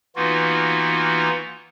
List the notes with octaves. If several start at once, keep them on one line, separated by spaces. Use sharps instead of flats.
E3 A#3 B3 D#4 F4 F#4